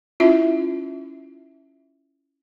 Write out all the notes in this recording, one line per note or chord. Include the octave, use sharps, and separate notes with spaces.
C#4 E4 F4 E5